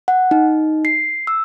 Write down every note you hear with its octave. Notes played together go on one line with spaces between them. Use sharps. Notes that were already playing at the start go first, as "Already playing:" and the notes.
F#5
D#4
C7
E6